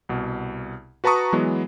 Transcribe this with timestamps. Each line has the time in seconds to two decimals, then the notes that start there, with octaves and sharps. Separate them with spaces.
0.09 C2 B2
1.04 F#4 B4 A5 A#5 C#6 D#6
1.33 E3 F#3 G#3 B3